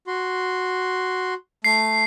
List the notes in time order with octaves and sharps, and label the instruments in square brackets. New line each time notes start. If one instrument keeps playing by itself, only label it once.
[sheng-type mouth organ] F#4 C6
[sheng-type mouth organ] A3 [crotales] C7